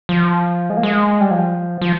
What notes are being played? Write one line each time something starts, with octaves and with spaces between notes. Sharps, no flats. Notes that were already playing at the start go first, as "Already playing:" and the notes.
F3
G#3
A#3
G#3
G3
F3
F3